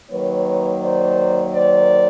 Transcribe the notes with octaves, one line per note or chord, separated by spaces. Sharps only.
D#3 F#3 A#3 B4 C#5
C5 D5
C5 D5